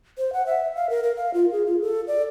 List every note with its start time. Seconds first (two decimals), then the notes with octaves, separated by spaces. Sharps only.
0.18 C5
0.33 F#5
0.46 E5
0.76 F5
0.90 A#4
1.03 A#4
1.17 F5
1.34 F4
1.52 G#4
1.66 F4
1.82 A4
2.08 D5